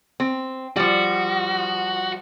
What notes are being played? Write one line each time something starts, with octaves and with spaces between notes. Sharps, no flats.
C4
F3 G3 F#4